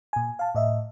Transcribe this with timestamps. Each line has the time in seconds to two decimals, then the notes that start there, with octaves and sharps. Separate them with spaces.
0.13 A#2 G#5
0.39 F5 A5
0.55 A2 D#5 E5